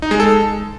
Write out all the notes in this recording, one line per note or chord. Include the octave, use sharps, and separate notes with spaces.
D#4
G#3
A4